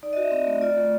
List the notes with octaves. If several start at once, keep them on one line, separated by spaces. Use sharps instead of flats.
D#4 D5
D#5
F#4
E5
C4 D#5
A3
F4 D5
A3